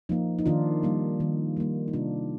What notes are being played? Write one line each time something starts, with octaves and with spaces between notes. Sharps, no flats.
F3 A#3 D#4
D#4
D#3 D4 F4
G3 A#3
D#3
G3 A#3
D#4
C3 D4 F4